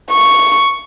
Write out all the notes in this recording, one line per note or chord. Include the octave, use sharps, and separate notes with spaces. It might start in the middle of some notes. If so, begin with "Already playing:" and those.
C#6